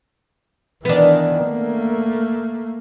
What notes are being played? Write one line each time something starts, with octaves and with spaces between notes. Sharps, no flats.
D#3 E3 B3 D4
A3 A#3